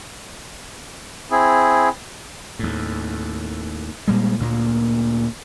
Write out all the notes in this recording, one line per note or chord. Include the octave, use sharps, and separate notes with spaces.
C4 E4 G#4
D#2 A2
A#2 G3 G#3
D2 A#2 A#3